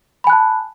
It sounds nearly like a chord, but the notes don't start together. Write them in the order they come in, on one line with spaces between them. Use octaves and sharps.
B5 G#5 F#6 A5